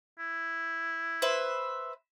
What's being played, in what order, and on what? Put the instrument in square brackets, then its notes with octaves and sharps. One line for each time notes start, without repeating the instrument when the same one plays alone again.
[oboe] E4
[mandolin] B4 C5 E5